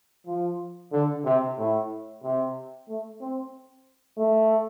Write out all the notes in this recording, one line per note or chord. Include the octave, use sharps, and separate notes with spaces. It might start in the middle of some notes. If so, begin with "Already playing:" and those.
F3
D3
C3
A2
C3
A3
C4
A3